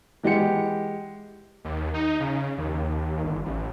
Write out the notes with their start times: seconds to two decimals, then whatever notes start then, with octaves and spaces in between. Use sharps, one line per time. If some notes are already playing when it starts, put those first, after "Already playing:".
0.23 E3 G#3 G4 F#5 C#7
1.64 D#2
1.94 D#4
2.20 C#3
2.58 D#2
3.24 G1
3.45 A1